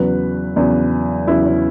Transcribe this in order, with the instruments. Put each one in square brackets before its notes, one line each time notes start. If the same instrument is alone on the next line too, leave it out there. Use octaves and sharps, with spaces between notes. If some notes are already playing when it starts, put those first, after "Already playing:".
Already playing: [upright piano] E2 C#3 F#3 B4
E2 C#3 F#3
E2 C#3 F#3 E4
C#4